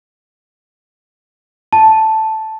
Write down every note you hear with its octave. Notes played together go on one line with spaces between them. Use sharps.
A5